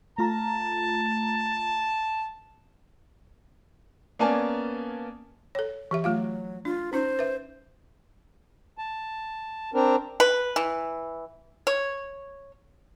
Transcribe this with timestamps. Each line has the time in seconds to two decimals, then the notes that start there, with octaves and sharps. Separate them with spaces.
0.18 A3 F4 A5 A#5
4.19 A#3 B3 C#4 D5 G#5 A5
5.55 A4 C#5
5.91 E3 G4 E5
6.04 F#3 A3 F4 F5
6.65 D4 F4
6.93 C#4 D#4 C5
7.19 B4 E5
8.78 A5
9.74 C4 D4 A#4
10.20 B4
10.56 E3
11.67 C#5